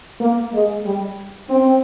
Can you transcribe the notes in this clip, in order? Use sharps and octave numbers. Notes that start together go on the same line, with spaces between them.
A#3
G#3
G3
C4